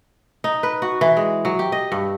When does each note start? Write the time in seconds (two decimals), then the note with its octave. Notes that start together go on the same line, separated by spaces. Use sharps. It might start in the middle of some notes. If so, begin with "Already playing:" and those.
0.44 D#4
0.63 B4
0.82 F#4
1.01 E3
1.17 G#3
1.45 F#3
1.59 G4
1.72 D#5
1.92 G2